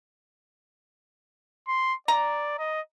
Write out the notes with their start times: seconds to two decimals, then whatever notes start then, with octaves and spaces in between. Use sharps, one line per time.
1.68 C6
2.08 D5 A#5
2.59 D#5